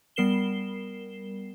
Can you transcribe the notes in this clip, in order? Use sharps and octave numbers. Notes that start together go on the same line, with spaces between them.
G3 B3 A#4 C7 E7 G7